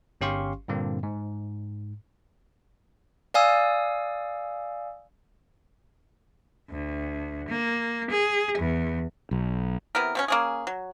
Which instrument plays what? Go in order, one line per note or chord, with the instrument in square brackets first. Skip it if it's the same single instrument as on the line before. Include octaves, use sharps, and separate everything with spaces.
[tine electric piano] G1 C#4 G4 F5 C6 C#6
G2 A#2 D3 A#3 C4
G#2
[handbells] D5 F5 G#5 D#6 E6
[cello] D2
A#3
G#4
E2
[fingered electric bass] B1
[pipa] C3 B3 E4 A#4
B2 C4 C#4
A#3 C#4 G#4
F#3